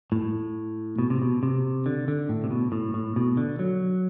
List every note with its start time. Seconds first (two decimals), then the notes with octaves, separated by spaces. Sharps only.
0.12 A2
0.99 B2
1.10 C3
1.22 B2
1.43 C3
1.86 D3
2.08 D3
2.29 A2
2.44 C3
2.51 B2
2.72 A2
2.94 A2
3.16 B2
3.37 D3
3.59 F#3